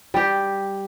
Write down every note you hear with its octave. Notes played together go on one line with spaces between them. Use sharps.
G3 G4